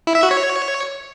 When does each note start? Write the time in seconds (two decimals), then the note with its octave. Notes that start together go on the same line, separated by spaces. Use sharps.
0.07 E4
0.15 E5
0.23 F#4
0.31 C#5